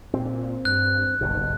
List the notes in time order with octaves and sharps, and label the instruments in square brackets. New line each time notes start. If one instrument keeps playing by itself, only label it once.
[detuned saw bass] A#2 [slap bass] C4
[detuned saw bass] G2 [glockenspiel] F#6
[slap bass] F#1 G2 B2 [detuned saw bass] B1